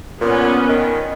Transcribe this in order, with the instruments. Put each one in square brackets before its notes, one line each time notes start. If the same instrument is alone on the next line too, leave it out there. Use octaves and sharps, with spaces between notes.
[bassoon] A#2 [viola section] B3 C#4
[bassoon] D#3